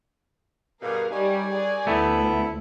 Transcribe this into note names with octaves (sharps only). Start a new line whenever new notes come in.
G2 B2 G#4 A#4 F5
F#2 G3 D#4 G4 C#5 G#5
G#4 D5
D2 A3 B3 E4